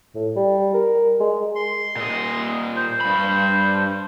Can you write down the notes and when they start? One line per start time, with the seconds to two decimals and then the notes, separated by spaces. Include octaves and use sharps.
0.15 A2
0.36 G3
0.74 A#4
1.20 G#3
1.55 C6
1.96 A#2 D#5
2.76 C5
3.01 G2 B5